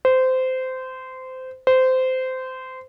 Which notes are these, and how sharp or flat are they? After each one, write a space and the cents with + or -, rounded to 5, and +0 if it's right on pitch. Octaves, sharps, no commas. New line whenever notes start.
C5 -20
C5 -20